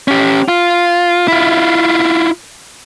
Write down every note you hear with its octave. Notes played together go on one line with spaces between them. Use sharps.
C#4 G4
F4
E4 F4